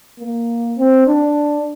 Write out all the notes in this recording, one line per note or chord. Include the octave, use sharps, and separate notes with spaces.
A#3
C4
D4